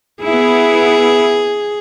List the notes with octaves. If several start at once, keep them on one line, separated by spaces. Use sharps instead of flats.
B3 E4 G#4